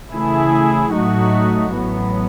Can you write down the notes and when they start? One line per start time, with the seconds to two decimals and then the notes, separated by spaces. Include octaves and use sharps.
0.12 C#3 E3 A3 E4 G#4
0.92 A2 F#3 A3 D#4 F#4
1.72 A1 A2 F#3 B3